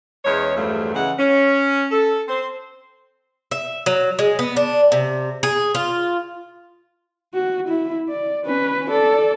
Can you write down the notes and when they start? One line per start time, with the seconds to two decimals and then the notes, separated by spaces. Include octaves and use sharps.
0.25 E2 G#3 C#4 C#5
0.56 E2 G2 F3 F#3 A3
0.94 C#3 E3 G#3 F#5
1.18 C#4
1.91 A4
2.28 C4 C5
3.51 E5
3.86 F#3
4.19 G#3
4.39 B3
4.56 D4
4.92 C3
5.43 G#4
5.75 F4
7.34 F#4
7.68 E4
8.09 D5
8.45 C#4 B4
8.90 A4 D5